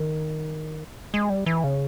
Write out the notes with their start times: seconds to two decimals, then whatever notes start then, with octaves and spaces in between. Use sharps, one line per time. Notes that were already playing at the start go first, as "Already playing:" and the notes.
Already playing: D#3
1.14 G#3
1.30 G3
1.46 E3
1.64 C#3